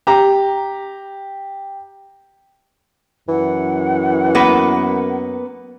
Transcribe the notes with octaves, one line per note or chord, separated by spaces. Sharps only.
G4 A#5
F#2 E3 F#5
A#3 B3 B4